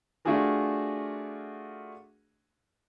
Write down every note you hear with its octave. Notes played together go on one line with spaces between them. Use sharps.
A3 D4 F4 F#4 G#4 A#4